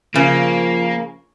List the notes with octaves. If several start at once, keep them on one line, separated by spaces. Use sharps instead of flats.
C#3 F3 A#3